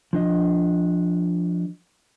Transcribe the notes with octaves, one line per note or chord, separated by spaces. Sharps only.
F3 D4 D#5